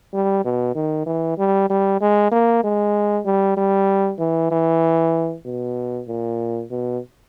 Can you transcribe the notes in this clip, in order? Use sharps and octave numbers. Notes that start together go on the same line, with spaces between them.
G3
B2
D#3
E3
G3
G3
G#3
A#3
G#3
G3
G3
E3
E3
B2
A#2
B2